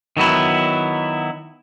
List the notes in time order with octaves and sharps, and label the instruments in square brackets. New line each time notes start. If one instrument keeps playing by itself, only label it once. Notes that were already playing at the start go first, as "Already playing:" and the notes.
[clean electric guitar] D#3 F#3 B3 E4